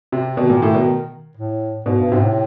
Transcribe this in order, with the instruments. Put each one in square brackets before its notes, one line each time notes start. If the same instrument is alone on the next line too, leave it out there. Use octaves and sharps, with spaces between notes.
[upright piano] C3
[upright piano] B2 [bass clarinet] D#3
[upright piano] A#2
A2
B2
[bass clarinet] A2
[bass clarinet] G#2 [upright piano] B2
[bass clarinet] G2
[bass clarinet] G#2 [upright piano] C3
[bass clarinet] A2